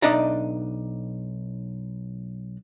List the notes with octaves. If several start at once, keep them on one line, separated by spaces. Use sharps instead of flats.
B1 D4 D#4 D5 E5 A#5